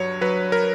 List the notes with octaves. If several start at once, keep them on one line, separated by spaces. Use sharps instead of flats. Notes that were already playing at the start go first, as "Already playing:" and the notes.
Already playing: G2 F#3 C#5
F#3 B4
A#4